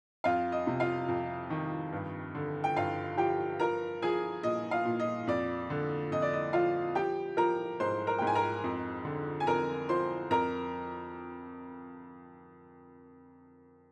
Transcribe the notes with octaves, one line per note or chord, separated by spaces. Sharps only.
F2 F4 F5
D#5
C3
F4 F5
F2
D#3
G2
D3
G5
G2 F4 F5
F3 G4 G5
F3 A#4 A#5
F3 G#4 G#5
A#2 D#5
F4 F5
A#2
D#5
F2 D5
D3
F2 D#5
D5
D#5
F3 F4 F5
F3 G4 G5
F3 A#4 A#5
G#2 C5 C6
A#4 A#5
G#2 G5
G#5
A#4 A#5
F2
D3
G#5
F2 A#4 A#5
F3 C5 C6
F2 A#4 A#5